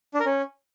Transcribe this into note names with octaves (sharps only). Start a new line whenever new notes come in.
D4
A#4
C#4